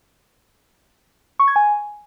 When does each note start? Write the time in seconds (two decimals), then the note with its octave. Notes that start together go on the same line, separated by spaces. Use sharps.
1.39 C#6
1.48 G#6
1.56 G#5